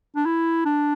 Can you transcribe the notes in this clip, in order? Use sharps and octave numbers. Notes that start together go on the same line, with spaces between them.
D4
E4
D4